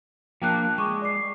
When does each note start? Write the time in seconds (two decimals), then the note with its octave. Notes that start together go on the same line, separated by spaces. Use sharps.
0.42 F3 A#3 D4 G5 A5 F#6
0.78 G#3 C#6 D6
1.02 D5 D6 C7